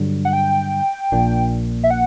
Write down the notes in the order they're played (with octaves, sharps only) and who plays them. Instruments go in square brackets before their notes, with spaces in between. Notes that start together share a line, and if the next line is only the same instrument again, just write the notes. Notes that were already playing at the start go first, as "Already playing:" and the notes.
Already playing: [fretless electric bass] G2 D3 F#3
[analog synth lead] F#5
G5
[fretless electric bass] A#1 A#2 A#3 D4
[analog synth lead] E5
F#5